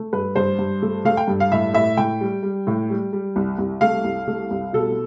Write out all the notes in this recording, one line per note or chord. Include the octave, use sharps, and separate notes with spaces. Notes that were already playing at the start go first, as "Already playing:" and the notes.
Already playing: A3
G2 B4
G2 C5
G2
A3
A3 F5
G5
G2
F5
A2 E5
A2 E5
A2 G5
G3
G3
A2
G3
G3
C2
C2
A3 F5
C2
A3
C2
B2 A4